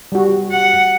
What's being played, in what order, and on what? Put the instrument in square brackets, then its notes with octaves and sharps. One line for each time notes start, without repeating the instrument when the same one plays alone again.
[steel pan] G3 F#4
[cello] F#5